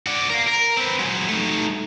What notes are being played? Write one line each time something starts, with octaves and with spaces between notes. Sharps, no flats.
F#4 D5
A#4 F5
A#4
C4 B4
F#3 G#3
A3 D#4